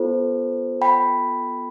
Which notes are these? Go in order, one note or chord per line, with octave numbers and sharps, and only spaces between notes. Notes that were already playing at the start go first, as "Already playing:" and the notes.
Already playing: B3 F4 A4 C5
G5 B5